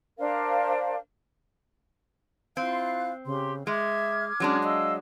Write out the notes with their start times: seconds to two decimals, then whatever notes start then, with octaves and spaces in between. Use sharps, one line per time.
0.18 D4 A#4 C5 F5
2.57 C4 E4 F4 F5 F#6
3.26 C#3 G4 C6
3.67 G#3 E5 D6 F6 G#6
4.40 F#3 G#3 C#4 D4
4.63 D#5 F5 E6